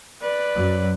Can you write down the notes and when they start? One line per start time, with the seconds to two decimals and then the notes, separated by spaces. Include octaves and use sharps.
0.22 B4 D5
0.55 F#2 F#3